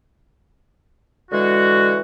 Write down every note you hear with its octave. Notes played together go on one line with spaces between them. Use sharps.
D3 E3 G#3 F#4